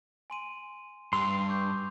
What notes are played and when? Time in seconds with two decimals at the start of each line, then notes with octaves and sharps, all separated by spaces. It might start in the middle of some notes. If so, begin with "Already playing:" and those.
0.30 G#5 C6 D#7
1.13 G2 C6 E6 F7
1.49 C#6 D6 G6